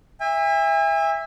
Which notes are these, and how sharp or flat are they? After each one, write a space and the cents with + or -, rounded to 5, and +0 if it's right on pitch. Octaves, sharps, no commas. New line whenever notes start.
E5 +0 G#5 -40